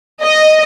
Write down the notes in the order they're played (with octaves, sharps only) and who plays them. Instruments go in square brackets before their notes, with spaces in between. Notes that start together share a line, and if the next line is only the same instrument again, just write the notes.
[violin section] D#5